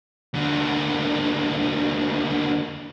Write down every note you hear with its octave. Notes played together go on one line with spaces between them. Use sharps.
D#2 D3